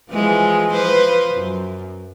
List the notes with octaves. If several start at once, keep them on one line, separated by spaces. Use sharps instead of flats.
E3 F3 G#3
F3 B4 C5
F#2